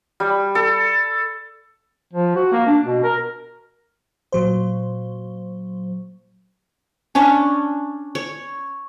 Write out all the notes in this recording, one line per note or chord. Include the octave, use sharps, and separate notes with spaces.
G3
A4
F3
F#4
A#3
D4
B2
A#4
A#2 F#3 C5
C#4 D4 C#5
C#5